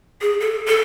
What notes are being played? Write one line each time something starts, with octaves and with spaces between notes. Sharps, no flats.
G#4
A4
A4